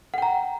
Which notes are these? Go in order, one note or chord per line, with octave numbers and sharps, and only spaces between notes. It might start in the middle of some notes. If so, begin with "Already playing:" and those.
F#5 G5 A#5